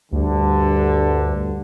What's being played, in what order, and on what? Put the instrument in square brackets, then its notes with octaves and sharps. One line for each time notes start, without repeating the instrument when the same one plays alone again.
[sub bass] D2 [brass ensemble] G2 D3